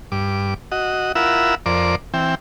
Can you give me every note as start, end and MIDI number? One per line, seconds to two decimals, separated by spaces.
0.12 0.54 43
0.12 0.54 86
0.72 1.12 66
0.72 1.12 75
1.15 1.55 64
1.15 1.55 65
1.15 1.55 70
1.15 1.55 78
1.15 1.55 83
1.15 1.55 88
1.66 1.96 41
1.66 1.96 70
1.66 1.96 72
1.66 1.96 74
1.66 1.96 86
2.14 2.35 52
2.14 2.35 60
2.14 2.35 79